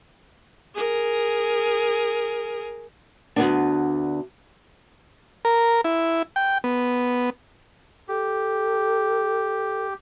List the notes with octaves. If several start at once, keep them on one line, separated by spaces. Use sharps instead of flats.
G#4 A#4
D2 B3 D4
A#4
E4
G5
B3
G4 A4